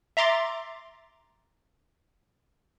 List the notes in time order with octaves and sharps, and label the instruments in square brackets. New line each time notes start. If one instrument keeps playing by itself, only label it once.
[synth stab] E5 A#5 C6 D6 A6